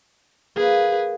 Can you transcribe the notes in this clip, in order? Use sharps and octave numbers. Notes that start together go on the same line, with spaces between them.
A#3 G#4 B4